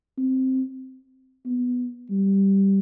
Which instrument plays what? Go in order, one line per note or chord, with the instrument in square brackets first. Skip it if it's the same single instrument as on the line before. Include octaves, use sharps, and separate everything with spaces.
[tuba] C4
B3
G3